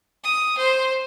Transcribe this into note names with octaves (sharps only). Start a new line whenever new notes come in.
D#6
C5